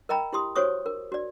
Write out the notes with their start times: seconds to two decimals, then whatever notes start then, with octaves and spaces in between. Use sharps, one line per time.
0.09 A#4 D#5 G5 A#5 B5
0.33 E4 G4 C6 D#6
0.56 F#4 C5 C#5 C#6 D#6
0.86 A#4
1.12 F#4 D5